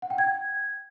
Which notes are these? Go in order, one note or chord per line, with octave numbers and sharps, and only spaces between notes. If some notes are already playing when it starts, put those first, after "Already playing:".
F#5
G5
G#6